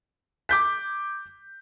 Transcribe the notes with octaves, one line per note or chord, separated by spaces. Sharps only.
D6 G6 B6